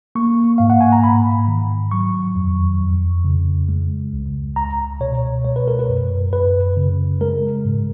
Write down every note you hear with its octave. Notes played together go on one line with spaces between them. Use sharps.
A#3 C#6
G#2 F5
F#5
G#5
A#5
G#2 B5
D#3
F#3 C#6
F2
F2
C#3
G#3
C#2
C#2 A#5
B2 C#5
G#3 C#5
B4
A#4
B4
F#2
F#2 B4
C#3
G#3 A#4
G#2